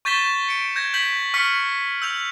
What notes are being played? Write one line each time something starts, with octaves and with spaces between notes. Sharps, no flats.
C#6 G6 A6 B6 E7 G7
C#7 D7
G6 G#6 A#6
G6 A#6 B6 F#7
C#6 F6 B6 C#7
E6 G6 F7